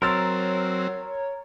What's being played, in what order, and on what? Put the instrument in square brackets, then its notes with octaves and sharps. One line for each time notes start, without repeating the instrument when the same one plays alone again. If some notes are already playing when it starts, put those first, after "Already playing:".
[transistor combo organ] F#3 C4 [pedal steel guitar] A#4 [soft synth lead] C#5 [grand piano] C6 E6 A6